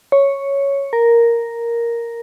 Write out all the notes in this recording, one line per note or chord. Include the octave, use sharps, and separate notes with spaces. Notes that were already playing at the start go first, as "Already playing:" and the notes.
C#5
A#4